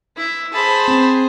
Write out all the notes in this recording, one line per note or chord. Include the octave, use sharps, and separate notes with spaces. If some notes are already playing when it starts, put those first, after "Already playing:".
E4 E5
G#4 C5 A5 B5
C4